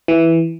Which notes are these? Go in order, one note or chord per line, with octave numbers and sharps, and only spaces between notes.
E3